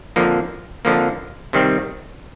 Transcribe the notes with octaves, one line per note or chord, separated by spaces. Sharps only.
F2 D3 F3 A#3
F2 D3 F3 A#3
C3 D#3 G3 C4